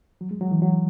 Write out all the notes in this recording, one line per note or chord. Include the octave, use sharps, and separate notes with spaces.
F#3
G#3
F#3
E3
F#3